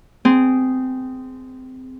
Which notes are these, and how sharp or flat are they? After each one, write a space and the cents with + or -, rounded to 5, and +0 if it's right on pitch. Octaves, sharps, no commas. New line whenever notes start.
C4 -20 G#4 +0